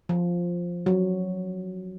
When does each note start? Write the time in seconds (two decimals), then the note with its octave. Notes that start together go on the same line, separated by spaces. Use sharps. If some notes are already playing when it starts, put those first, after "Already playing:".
0.09 F3
0.86 F#3